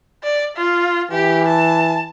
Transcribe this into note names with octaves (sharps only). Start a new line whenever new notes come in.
D5
F4
E3 G4
A5